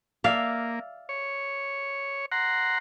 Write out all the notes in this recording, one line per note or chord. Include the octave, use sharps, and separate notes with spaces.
A#3 D5 E5 F5
C#5
F#5 A#5 C6